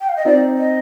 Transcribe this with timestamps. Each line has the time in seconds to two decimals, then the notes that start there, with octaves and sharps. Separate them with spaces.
0.01 G5
0.09 F5
0.16 D#5
0.25 C4 D#4 D5
0.58 D#5